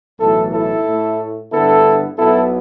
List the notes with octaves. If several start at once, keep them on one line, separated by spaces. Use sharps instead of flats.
B1 A2 E3 E4 A4
E4 A4
A2 A3
G2 D3 B3 E4 A4
B1 B2 B3 E4 A4